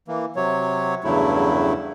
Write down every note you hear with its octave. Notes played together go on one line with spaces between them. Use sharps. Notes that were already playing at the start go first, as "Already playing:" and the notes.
E3 A#3
C3 F#3 C#5
E2 G2 C#3 F#3 A3 E4